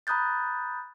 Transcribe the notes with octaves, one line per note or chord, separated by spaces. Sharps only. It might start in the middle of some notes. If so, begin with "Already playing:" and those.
A#5 B5 D#6 F#6 G6 A6